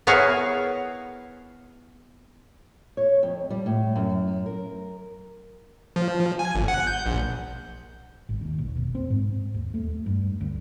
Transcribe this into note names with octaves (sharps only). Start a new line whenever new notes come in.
B3 E4 G#4 A#4 C#5 F5
C#5
F2
G3
A2
F#2
A#4
F3
G#5
G1
F#5
G6
A#1
G#1
D#2
B1
F1
C4
G#2
D#2
A3
G2
D2